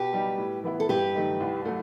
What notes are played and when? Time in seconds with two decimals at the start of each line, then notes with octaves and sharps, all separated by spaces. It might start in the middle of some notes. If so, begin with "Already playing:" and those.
Already playing: B2 G4 B4
0.13 G3 D#4
0.38 A2
0.64 E3 B3 E4
0.80 A4
0.89 G2 G4 B4
1.15 D#3 A3 D#4
1.40 C2
1.65 F#3 A3